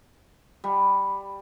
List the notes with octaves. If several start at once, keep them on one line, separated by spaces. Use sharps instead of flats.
G3